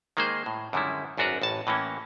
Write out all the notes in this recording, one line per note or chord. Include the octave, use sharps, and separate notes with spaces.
D#3 G#3 A#3 G#4 C5
A2
F#2 D3 D#3 G3 G#3 E4
G#1 F#2 D4 F#4 A#4 B4
A1 A2 A5
A2 E3 A#3 C#4